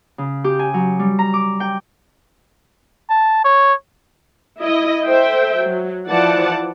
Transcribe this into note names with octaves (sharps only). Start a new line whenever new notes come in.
C#3
G4
G#5
F#3
G3
A#5
D6
G5
A5
C#5
E4 D#5
A4 C5 E5 G5
F#3
E3 F3 D5 F#5 A5